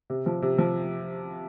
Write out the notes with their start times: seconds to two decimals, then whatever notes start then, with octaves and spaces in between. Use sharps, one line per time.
0.10 C3
0.26 F3
0.42 C3
0.58 F3